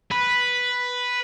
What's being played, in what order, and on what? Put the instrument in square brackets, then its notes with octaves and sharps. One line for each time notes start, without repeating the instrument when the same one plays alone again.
[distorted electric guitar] B4